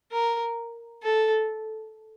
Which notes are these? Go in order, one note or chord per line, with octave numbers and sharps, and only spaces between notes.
A#4
A4